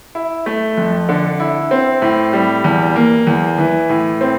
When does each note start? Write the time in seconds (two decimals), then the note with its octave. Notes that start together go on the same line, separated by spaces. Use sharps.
0.15 E4
0.46 A3
0.77 F2
1.09 D3
1.40 E4
1.71 C4
2.02 A2
2.33 G3
2.64 E2
2.96 A#3
3.27 E2
3.59 E3
3.89 A2
4.21 C4